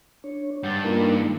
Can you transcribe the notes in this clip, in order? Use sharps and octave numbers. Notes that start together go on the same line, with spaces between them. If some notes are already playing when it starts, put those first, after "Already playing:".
D4 C#5
G2 F#5 G6 A6
A#3 D4 D#4 F4 A#4
D#3 G#3